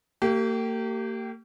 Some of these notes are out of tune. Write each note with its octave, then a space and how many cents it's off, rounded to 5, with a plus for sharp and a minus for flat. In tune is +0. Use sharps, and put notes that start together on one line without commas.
A#3 -40 G4 -20